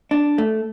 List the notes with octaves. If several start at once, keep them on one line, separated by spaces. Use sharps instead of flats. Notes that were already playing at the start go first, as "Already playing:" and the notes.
D4
A3